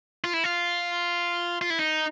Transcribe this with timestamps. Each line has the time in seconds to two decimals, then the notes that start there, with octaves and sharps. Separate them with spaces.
0.24 F4
0.34 E4
0.44 F4
1.61 F4
1.70 E4
1.79 D#4